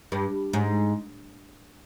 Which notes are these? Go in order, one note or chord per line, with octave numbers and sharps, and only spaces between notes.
G2
G#2